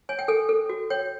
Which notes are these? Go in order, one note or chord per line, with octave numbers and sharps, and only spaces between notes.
C#5 G#5
G5
A4 G#5
A4
F#4
C#5 G5